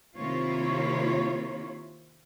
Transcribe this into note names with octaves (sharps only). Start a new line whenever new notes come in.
C3 D#3 A#3 E4 F4 C#5